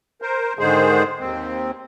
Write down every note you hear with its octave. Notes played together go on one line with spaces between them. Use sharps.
A#4 C5
G#2 D3 D#3 G#3 G#4 C5
D#2 C4